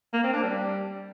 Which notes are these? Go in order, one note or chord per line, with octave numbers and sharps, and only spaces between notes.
A#3
C4
D4
G3